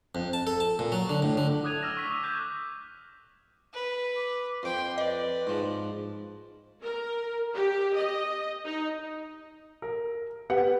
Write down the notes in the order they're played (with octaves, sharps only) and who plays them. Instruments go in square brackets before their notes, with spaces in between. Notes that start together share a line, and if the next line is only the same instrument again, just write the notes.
[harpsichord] F2
A5
A4
A5
A#2
F#3
D3
A2
D3
[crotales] D6 D#6 F#6 G#6 D#7 F7
E6 F6 G#6 A#6 E7
C#6 D6 E6 B6
D6 D#6 F#6 B6
D6 F#6 G6 B6
[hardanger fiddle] B4
[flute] D6
[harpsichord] F2 D6 [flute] C5 [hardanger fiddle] G5 C6
[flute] B4 [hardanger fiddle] D5 [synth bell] D#5
[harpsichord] G#2 F3
[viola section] A#4
G4
D#5
D#4
[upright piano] A#4
B3 G4 F#5